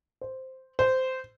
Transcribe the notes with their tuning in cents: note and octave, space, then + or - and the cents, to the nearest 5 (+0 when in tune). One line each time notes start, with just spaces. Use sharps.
C5 -5
C5 -15